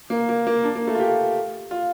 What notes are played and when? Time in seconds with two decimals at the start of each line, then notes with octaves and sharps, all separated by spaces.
0.10 A#3
0.29 A#3
0.47 A#3
0.64 D4
0.75 A#3
0.87 A3
0.95 F4
1.00 G4
1.71 F4